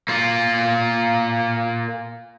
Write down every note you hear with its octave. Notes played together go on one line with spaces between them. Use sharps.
A#3 F4